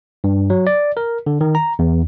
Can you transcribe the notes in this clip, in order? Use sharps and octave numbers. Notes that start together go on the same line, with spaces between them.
G2
F#3
D5
A#4
D3
D#3
A#5
E2